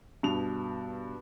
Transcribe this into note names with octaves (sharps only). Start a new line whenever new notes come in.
G2 B2 F7